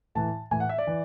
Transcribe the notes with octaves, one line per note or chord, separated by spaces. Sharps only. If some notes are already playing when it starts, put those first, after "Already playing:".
A2 E3 A5
A2 E3 G#5
F#5
E5
D5
E3